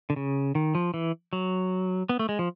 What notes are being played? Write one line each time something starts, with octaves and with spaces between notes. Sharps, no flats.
D3
C#3
D#3
F3
E3
F#3
B3
A3
G#3
F3